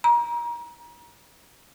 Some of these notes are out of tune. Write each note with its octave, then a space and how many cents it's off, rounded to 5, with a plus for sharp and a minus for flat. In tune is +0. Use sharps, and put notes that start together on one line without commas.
A#5 +30